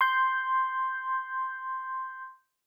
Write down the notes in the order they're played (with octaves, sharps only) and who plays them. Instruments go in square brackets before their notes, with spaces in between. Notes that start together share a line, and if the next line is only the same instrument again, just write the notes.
[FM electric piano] C6 G6